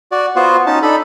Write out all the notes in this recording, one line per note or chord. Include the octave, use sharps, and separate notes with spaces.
F#4 D5
B3 F4 F#4 C5
C#4 D#4 A5
D4 D#4 A4 B5